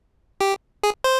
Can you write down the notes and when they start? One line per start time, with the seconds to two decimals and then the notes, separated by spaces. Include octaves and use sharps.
0.41 G4
0.83 G#4
1.04 C5